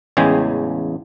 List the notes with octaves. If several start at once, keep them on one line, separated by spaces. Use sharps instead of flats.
A1 E2 C#3 G#3 G5 G#5